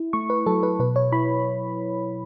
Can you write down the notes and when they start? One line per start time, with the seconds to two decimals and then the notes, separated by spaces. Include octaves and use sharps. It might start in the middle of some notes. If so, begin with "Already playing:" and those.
Already playing: E4
0.13 A3 C#6
0.30 B4
0.46 F#3 A4
0.63 B4
0.79 B2 B4
0.96 C#5
1.12 E4 B5